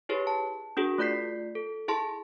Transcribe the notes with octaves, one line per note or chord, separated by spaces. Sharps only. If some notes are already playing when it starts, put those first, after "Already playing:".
E4 G4 G#4 B4 C#5
A5
D4 F#4 G#4 A#4
A3 F4 D5 G6 B6 C7
A4
E4 G#4 A5 C6